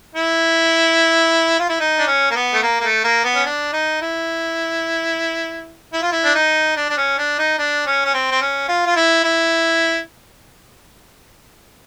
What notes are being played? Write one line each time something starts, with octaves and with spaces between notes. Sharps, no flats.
E4
F4
E4
D#4
D4
C#4
A#3
B3
A3
A#3
A#3
A3
A#3
B3
C#4
D4
D#4
E4
E4
F4
E4
D4
D#4
D4
D4
C#4
D4
D#4
D4
C#4
C#4
C4
C4
C#4
F4
F4
E4
E4